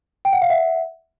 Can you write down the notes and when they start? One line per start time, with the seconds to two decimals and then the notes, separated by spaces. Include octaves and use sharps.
0.25 G5
0.33 F#5
0.42 F5
0.49 E5 F#5